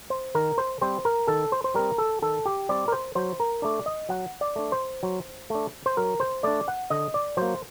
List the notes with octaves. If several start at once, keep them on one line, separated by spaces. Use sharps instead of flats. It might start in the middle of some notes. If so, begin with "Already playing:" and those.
C5
D#3 A#4
C5
G3 C4 C5
A#4
D#3 A4
C5
C5
G3 C4 A#4
A4
D#3 A4
G4
G3 C4 D5
A#4
C5
F#3 C5
A#4
A3 D4 D5
D#5
F#3 F#5
D5
A3 D4
C5
F#3
A3 D4
C5
F#3 A#4
C5
A3 D4 D5
F#5
D3 D#5
D5
F#3 A#3 C5